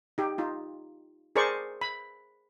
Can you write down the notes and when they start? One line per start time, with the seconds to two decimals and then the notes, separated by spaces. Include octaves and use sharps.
0.18 D#4 G4
0.38 D#4 F4
1.36 G#4 A#4 C5 D5 C#6
1.81 B5